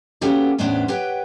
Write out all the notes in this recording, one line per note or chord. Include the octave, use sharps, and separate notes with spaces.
A#3 B3 C#4 F#4 G4 A4
E2 A2 B3 C#4 D4 C5
G4 B4 C#5 F#5 G5